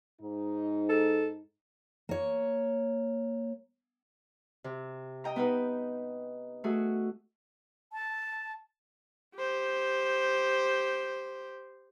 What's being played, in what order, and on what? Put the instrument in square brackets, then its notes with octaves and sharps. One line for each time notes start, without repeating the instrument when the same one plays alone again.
[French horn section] G#2 D#4
[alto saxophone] A4
[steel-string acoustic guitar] A#3 C#5
[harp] C3
D#5 G5 A#5
B3 D#4 B4
A3 F#4 G#4
[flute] A5
[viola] G4 C5